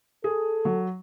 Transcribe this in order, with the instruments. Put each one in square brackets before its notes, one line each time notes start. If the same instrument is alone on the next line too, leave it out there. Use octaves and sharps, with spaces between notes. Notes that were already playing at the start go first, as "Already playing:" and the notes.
[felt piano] G#4 [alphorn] A4
[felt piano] F#3